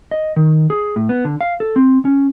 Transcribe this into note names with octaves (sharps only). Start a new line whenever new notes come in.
D#5
D#3
G#4
A2
B3
D3
F5
A4
C4
C#4